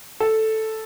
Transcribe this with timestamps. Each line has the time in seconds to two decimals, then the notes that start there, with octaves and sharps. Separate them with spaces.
0.20 A4